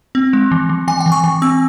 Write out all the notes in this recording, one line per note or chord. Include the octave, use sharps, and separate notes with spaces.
C4
G#3
E3
E3
E3 G#5
G5
E3
C#6
E3
C4 E6